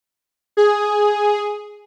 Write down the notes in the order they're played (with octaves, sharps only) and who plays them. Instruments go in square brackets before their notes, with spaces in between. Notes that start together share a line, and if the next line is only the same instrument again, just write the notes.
[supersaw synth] G#4